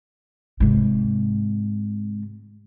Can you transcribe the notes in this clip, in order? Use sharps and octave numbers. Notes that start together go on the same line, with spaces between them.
G#2 C3